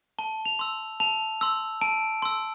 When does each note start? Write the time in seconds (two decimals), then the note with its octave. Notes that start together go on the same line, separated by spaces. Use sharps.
0.19 A5 G7
0.45 F7
0.59 C6 E6
1.00 A5 F7
1.41 C6 E6
1.81 A5 D7
2.22 C6 E6